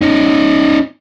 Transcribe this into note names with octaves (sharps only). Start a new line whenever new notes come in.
C#4 D#4